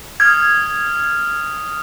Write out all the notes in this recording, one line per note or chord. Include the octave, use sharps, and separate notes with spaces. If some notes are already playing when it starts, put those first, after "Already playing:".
D#6 F6 G#6